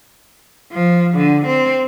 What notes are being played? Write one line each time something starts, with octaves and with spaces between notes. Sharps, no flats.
F3
D3
C4